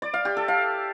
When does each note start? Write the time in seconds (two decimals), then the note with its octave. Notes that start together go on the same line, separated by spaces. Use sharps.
0.02 D5
0.14 F5
0.25 G4
0.37 A4
0.48 F5